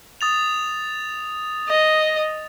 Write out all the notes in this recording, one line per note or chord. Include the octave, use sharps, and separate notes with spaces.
D#6 A6 F7
D#5